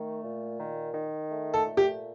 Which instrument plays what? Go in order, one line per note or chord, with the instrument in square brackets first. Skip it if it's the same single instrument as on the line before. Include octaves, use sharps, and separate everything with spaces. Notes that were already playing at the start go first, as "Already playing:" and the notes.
Already playing: [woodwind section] D#3 A3
A#2
D#3
D#3
A3
[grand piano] A4
[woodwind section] A#2
[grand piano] G4